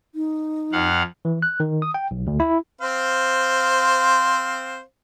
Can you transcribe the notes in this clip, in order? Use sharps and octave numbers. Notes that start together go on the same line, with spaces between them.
D#4
F2 F5 F#5
E3
F#6
D#3
D#6
G5
B1
D2
E4
C4 C5 F5